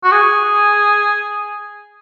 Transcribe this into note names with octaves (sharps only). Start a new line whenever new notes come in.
F#4
G#4